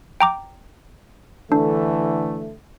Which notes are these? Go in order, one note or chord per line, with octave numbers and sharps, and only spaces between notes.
G5 A#5 D6
D3 E3 A3 D4